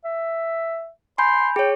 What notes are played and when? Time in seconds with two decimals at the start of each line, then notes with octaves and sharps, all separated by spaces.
0.04 E5
1.18 G#5 B5 C6 G6
1.56 G#4 C#5 G5